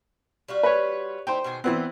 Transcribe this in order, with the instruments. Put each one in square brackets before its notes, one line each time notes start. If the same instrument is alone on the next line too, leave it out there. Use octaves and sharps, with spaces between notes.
[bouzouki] G3 F4 F#4
[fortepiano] B4 C#5
[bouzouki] D#4 E4 [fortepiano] C5 G5
[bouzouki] B2 D#3 G#4
[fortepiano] E3 B3 C4 [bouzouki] C5 D#5 F#5